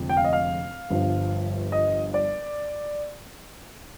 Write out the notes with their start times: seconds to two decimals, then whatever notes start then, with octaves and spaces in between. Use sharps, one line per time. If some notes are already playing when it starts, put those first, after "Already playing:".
Already playing: F1 F2 D3 G#3
0.09 G5
0.17 F5
0.24 D#5
0.33 F5
0.90 G1 G2 F3
1.72 D#5
2.14 D5